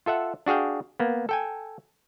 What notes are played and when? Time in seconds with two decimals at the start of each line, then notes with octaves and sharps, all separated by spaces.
0.06 F4 A4 E5 F#5
0.46 D4 F#4 G#4 F5 G5
1.00 A#3 B3
1.29 A4 G5 G#5